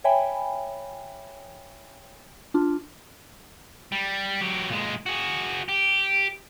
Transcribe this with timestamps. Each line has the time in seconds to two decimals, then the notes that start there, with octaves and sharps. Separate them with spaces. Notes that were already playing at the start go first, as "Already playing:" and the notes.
0.04 C#5 E5 G5 G#5 B5
2.54 D4 F4
3.92 G3
4.41 F#3 G4
4.70 A#2 G#3
5.06 F#4 G#4
5.69 G4